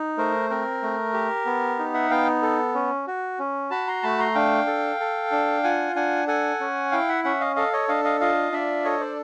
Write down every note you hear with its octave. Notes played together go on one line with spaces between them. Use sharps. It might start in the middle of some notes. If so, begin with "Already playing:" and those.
Already playing: D#4
A3 A#4 C5
C4 A#4
A3
G4
B3
D#4
E5 F#5
B3 F5 G5
A4
C#4
F#4
C#4
F#4 A5 B5
A#5 C6
A3 A5 B5
A#5 C6
D4 F5 G5
A4
A4
D4
F4 F#5 G#5
D4 F#5 G#5
A4 F#5 G#5
C#4
E4 F5 G5
E5 F#5
C#4 E5 F#5
D#5 F5
A4 D#5 F5
C#5 D#5
D4 D#5 F5
D#5 F5
F4 D#5 F5
D4 D5 E5
A4 C#5 D#5
C5 D5